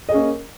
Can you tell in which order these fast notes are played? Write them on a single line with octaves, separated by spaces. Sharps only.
D#5 G#4 C#4 A#3